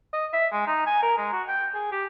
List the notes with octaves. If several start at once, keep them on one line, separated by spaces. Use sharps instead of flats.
D#5
E5
G#3
D#4
G#5
A#4
G#3
F#4
G5
G#4
G4